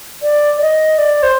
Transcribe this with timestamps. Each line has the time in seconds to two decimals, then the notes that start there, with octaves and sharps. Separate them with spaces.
0.22 D5
0.61 D#5
0.98 D5
1.23 C5